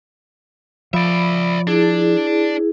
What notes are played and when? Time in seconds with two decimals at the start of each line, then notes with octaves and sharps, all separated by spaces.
0.94 F3 D5 E5 B5
1.67 D4 E4 G#4